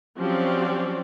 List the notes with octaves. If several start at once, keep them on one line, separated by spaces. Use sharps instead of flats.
F3 F#3 C4 C#4 G4 D5